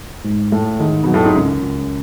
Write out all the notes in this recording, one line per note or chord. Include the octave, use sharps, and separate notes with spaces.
G#2
A2 A3
G#2 D#3
B2 F#3
A2
G#2
C#2 F#2
C#2